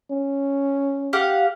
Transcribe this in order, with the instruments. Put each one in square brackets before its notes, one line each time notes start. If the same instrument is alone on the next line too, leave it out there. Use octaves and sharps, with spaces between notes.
[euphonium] C#4
[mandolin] G4 F5 F#5